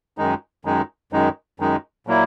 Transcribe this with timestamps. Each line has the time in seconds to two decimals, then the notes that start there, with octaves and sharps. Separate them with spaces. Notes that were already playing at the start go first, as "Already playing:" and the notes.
0.18 F#2 D#3 G#3 D#4
0.65 F#2 D#3 G#3 D#4
1.12 F#2 D#3 G#3 D#4
1.60 F#2 D#3 G#3 D#4
2.07 A#2 F#3 A#3 E4